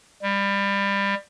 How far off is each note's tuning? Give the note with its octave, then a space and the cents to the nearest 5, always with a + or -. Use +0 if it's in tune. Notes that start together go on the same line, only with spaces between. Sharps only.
G3 +25